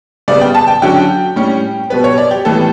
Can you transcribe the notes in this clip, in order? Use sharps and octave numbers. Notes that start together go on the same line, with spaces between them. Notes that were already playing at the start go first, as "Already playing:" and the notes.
C#3 G3 B3 D5
G5
A5
G5
D3 F#3 C#4 G5
A2 G3 C#4
B2 G3 B3 B4
C#5
D5
G4
A2 E3 G3 B3 A4